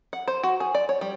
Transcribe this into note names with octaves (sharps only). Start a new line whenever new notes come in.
F#5
C5
F#4
G#4
D5
C#5
G3